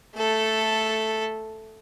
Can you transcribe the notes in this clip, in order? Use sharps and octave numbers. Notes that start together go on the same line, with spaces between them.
A3 A4